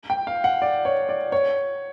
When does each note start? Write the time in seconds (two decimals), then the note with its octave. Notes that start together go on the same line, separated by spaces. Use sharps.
0.10 G5
0.27 F5
0.44 F#5
0.62 D5
0.85 C#5
1.09 D5
1.32 C#5